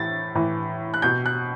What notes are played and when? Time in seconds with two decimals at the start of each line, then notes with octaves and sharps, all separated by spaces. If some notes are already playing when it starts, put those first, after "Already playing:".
Already playing: A2 E3 A6
0.35 A2 E3
0.94 F#6
1.02 B2 G6
1.26 F#6